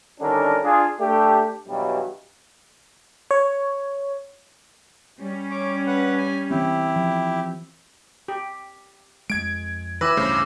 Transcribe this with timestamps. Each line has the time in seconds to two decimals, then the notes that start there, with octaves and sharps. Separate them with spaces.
0.20 D3 D#3 G3 C#4 D4 A#4
0.64 D4 F4 G#4
0.99 A3 D4 G4
1.67 G2 B2 E3 F#3 G3
3.31 C#5
5.18 G3 C#4
5.51 C#5 D6
5.87 B4 F#5
6.18 G#5
6.51 E3 C4 E4 G4
6.96 F3
8.28 G4
9.30 F2 G#3 G#6 D7
10.01 E3 E4 B4 D6 E6 A#6
10.17 D1 G2 C#3 A3 C5